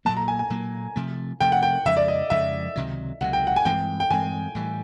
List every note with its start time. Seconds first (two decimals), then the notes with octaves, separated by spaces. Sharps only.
0.05 A#2 F#3 A#3 A5
0.17 A#5
0.28 G#5
0.39 G#5
0.50 A#2 F#3 A#3
0.96 C3 F3 A3
1.40 C3 F3 A3 G5
1.52 F#5
1.63 G5
1.85 F2 C#3 F3 G#3 E5
1.97 D5
2.08 D#5
2.30 F2 C#3 F3 G#3 E5
2.76 C#2 C3 D#3 F#3
3.21 C#2 C3 D#3 F#3 F#5
3.33 G5
3.47 F#5
3.56 G#5
3.65 G2 E3 G#3 C4 G5
4.00 G5
4.10 G2 E3 G#3 C4 G#5
4.55 A2 E3 G3